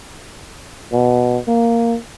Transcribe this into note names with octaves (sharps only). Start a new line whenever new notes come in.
B2
A#3